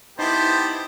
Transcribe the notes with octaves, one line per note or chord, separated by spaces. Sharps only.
B3 D#4 E4 G4 C5 A5